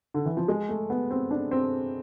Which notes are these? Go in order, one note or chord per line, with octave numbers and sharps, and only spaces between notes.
D3
E3
F3
G#3
A3
B3
C4
D4
C4